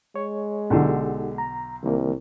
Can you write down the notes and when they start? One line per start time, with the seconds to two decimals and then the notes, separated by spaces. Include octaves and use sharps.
0.16 G#3 C#5
0.70 B1 D3 D#4 G4 A4
1.38 A#5
1.83 C2 D#3 A#3